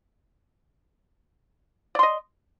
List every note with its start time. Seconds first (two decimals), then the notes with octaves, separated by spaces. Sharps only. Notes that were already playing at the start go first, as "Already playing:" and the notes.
1.95 D5
1.99 C6
2.03 D#5